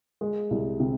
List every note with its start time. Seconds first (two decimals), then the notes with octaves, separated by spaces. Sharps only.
0.21 G#3
0.50 C2
0.80 C3